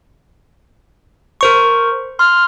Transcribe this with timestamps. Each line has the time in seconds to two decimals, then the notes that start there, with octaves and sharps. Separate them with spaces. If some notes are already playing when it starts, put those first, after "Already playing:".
1.41 A#4 C5 C#6
2.19 C6 F6